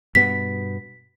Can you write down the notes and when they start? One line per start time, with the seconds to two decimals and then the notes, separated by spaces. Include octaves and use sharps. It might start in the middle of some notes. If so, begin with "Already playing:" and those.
0.15 G2 B2 B3 B6